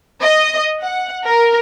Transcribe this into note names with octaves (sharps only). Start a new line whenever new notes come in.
D#5
F#5
A#4